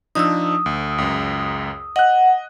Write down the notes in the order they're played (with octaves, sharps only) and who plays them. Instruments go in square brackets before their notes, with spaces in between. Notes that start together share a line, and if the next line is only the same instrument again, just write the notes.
[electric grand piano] F3 D4 D#4 [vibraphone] D#6 E6
[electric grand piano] D2
C#2 F#2
[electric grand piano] D#5 F#6 [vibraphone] F#5